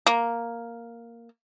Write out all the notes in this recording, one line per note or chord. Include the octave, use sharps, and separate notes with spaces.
A#3